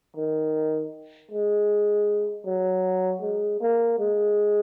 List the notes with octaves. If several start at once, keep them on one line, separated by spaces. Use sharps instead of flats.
D#3
G#3
F#3
G#3
A#3
G#3